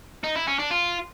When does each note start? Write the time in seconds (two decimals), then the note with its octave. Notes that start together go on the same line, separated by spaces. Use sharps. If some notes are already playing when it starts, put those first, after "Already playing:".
0.24 D#4
0.36 E4
0.47 C#4
0.59 D4
0.71 F4